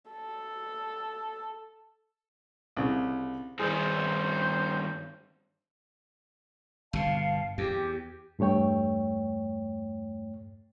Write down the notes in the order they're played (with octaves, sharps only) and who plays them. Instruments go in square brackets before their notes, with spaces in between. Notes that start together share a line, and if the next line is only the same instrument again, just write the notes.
[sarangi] A4
[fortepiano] C2 C#3
[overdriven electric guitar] G2 D#3 [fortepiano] G#4 [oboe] C5
[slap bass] G1 B2 [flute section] F5 A5
[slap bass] E2 [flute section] G4
[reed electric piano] E2 G2 A3 C#5 G5